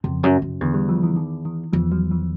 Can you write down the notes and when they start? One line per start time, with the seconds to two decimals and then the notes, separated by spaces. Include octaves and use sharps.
0.04 F2 C#3
0.23 F#2
0.42 F#2
0.61 E2 D3
0.74 G3
0.89 F3
1.03 E3
1.16 D#3
1.45 E3
1.73 E2 F3
1.92 F#3
2.11 F3